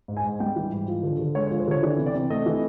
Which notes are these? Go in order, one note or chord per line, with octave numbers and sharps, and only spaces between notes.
G#2
G#5
G#2
G3 G5
E3
G#2
F3
D3
D3
G#3 C#5
C#5
F3
C5
D3 C#5
E3 D5
C3
D5
C3
A3 D#5
E3